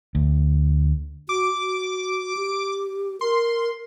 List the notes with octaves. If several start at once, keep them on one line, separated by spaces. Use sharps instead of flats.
D2
F#4 D6
F#4
G4
A#4 C6